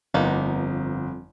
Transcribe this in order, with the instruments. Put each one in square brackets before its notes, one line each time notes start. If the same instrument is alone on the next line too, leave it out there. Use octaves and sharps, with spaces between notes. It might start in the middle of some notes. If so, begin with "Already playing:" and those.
[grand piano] G1 [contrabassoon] F2 [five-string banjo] A#3 B3 D#4